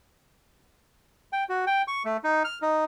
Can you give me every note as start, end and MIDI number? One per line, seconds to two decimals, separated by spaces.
1.33 1.44 79
1.49 1.65 66
1.67 1.82 79
1.88 2.03 85
2.05 2.17 57
2.24 2.43 63
2.44 2.59 89
2.62 2.85 63